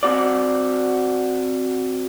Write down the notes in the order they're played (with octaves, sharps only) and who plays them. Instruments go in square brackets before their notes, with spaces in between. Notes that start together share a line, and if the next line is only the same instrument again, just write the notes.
[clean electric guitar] C4 F#4 D5